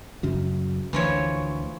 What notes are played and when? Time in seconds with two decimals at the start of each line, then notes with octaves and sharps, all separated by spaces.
0.23 F#2 C#3 F#3
0.93 D2 E3 F3 C#5